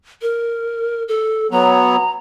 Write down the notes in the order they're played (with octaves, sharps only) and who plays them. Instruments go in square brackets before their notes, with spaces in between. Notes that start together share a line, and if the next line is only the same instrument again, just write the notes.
[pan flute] A#4
A4
[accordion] F#3 B3 [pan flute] A#5